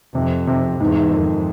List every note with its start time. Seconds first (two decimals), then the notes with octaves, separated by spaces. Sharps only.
0.15 F2 C3
0.47 C3
0.80 E2 G#2
1.12 F2 D#3